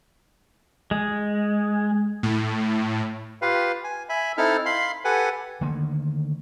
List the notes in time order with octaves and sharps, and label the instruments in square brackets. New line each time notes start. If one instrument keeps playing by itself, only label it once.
[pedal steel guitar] G#3
[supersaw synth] A2
[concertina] F4 G4 B4 F5
G#5
E5 G#5 B5
C4 D#4 E4 A4 F6
F5 B5 C6
G4 A4 B4 F#5 G#5
[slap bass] D3 D#3 A3 A#3